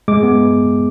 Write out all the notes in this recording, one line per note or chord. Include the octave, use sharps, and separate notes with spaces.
G#3 D6
B3